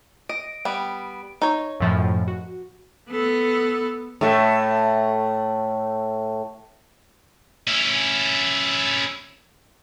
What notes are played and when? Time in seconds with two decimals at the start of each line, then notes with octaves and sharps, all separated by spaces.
0.29 D#5 D7
0.65 G3 B3
1.42 D#4 C#5
1.80 F#2 A2 F3
2.28 F#4
3.09 B3 A4
4.21 A2 A3
7.68 C#4 E4